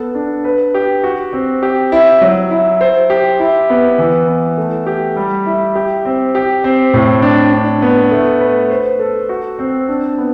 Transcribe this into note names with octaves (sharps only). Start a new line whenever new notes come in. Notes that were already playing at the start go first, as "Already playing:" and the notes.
Already playing: B3 A4
D4
B4
G4
F#4
C4
G4
E4
F#3
E4
C5
G4
E4
B3
E3
B3
A3
G4
G3
E4
G4
C4
G4
C4
A2
D4
D4
B3
A3
B4
C5
A4
F#4
C4
D4
B3